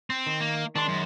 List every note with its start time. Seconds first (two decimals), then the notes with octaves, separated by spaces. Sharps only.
0.10 C4
0.27 D#3
0.40 A#3
0.76 D#3 G#3 D4 C6
0.88 F#2